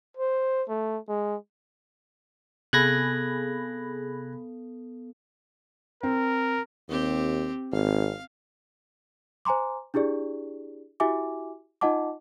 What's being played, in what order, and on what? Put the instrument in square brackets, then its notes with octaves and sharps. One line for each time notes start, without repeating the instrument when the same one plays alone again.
[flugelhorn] C5
A3
G#3
[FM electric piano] C3 G#4 B5 [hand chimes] B3 A4 [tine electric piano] F#6 G#6 A#6
[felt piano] C4 [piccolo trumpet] A#4
[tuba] D#2 [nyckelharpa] C4 G4
[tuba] G#1 [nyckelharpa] F5
[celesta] C5 G#5 A#5 C6 D6
D4 E4 G4 G#4 D5
E4 F#4 G4 E5 G#5 D6
D#4 F4 D#5 F#5 A5 D6